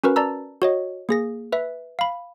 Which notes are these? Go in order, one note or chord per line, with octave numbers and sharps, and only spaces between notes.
C#4 F#4 A#4 B4
D5 A5 A#5 E6
F#4 C#5 D#5
A#3 G#4 A#6
B4 E5
F5 B5